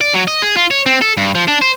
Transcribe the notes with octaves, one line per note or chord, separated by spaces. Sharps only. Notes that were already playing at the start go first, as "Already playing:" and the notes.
D5
F#3
D#5
G#4
F4
C#5
C4
A4
G2
F3
D4
C5